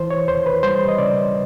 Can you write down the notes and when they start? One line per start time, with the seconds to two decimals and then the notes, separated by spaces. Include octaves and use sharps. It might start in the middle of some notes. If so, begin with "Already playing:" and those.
Already playing: E3 C5
0.10 C#5
0.28 D#2 C5
0.46 B4
0.63 G3 C5
0.88 D#5
0.98 C#3 D5